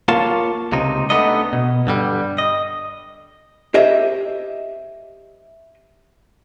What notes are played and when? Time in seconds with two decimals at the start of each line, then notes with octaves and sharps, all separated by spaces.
0.08 A#3 F4 C#5 A5
0.72 C#2 C3 D#4
1.10 A3 B3 D4 D#4 D#5
1.53 B2
1.87 G2 D3 G3
2.38 D#5
3.74 G4 C5 D#5 E5